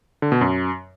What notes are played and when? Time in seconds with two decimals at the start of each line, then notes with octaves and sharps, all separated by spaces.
0.22 D3
0.32 B2
0.41 F#2